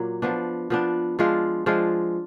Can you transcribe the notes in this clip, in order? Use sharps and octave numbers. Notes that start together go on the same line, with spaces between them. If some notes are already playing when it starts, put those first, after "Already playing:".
Already playing: A#2 F#3 A#3
F3 B3 D4
F3 B3 D4
F3 G#3 D4 F4
F3 G#3 D4 F4